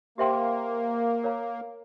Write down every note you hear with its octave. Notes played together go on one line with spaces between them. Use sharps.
A#3 G4 C5 E5 G5 C6
A#4 C#5 F5 A#5